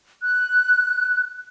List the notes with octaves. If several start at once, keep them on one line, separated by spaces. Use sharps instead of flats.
F#6